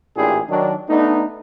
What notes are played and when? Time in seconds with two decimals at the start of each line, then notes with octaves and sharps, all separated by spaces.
0.16 A1 A#2 D4 E4 G4 G#4
0.49 D#3 F#3 D4
0.89 A3 B3 D4 D#4